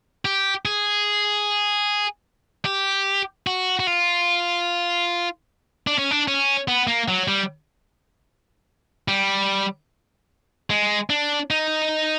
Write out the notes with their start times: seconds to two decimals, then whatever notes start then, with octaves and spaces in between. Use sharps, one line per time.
0.25 G4
0.65 G#4
2.65 G4
3.47 F#4
3.80 F#4
3.87 F4
5.87 D4
5.98 C#4
6.11 D4
6.28 C#4
6.68 B3
6.87 A#3
7.08 F#3
7.28 G3
9.08 G3
10.70 G#3
11.10 D4
11.50 D#4